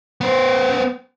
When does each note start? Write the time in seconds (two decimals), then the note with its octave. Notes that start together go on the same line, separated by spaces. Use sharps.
0.21 B3 C5